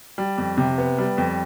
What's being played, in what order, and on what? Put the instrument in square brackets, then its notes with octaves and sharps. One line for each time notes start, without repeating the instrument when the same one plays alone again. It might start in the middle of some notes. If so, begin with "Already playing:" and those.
[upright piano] G3
F2
C3
B3
G3
F2